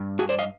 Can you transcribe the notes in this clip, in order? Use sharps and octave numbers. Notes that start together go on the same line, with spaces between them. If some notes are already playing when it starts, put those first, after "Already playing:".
Already playing: G2
F#4 G#4
C5 D5
D#5 F5